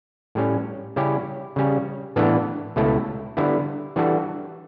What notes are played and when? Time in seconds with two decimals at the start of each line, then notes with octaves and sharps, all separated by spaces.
0.35 A2 G3 C#4
0.96 C#3 G3 C#4 E4 G4
1.56 C#3 G3 C#4
2.16 A2 E3 B3 D4 A4
2.76 C#2 B2 A3 E4 A4
3.37 D3 G3 B3 E4
3.96 E3 G3 D4 F#4 A4